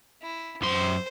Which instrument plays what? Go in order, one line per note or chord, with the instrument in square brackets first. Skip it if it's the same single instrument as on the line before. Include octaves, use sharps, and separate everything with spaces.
[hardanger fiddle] E4
[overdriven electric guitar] F#2 C6 [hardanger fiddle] C5